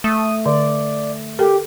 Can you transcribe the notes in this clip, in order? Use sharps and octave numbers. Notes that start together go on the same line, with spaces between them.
A3 D#6
D3 D5
G4 A4 A#4